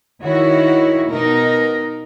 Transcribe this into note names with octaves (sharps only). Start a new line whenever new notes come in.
D#3 E4 F#4 C#5
B2 D#4 A#4